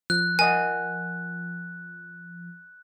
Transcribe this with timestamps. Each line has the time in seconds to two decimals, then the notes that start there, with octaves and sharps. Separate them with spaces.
0.10 F3 F#6
0.39 A#4 D#5 F#5 G#5